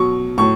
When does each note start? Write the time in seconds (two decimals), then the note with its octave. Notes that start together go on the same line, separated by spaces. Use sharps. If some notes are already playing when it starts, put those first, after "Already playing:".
Already playing: B2 F#3 C#6
0.38 A2 F#3 C#6